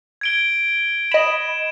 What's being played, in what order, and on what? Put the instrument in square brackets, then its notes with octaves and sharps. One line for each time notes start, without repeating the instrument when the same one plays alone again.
[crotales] G#6 D7 G7
[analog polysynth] D#5 B5 [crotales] E7